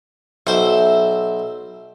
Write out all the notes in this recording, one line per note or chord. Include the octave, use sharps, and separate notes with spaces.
B1 C5 E5